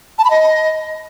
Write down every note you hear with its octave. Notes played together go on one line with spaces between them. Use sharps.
A5
B5
D#5